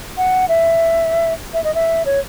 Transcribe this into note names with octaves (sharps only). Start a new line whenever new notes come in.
F#5
E5
E5
D#5
E5
C#5